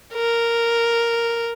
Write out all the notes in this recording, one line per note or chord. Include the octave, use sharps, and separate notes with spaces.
A#4